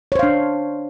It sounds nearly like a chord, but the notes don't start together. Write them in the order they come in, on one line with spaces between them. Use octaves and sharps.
C#5 C5 F5 D4